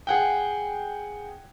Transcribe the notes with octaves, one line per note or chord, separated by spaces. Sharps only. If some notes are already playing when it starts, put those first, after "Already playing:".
G#4 F#5 G5